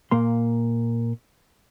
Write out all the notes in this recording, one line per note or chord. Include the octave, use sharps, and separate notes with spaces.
A#2 A#3 C6